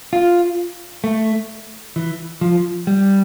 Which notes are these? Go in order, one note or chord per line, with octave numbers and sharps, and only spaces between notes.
F4
A3
E3
F3
G3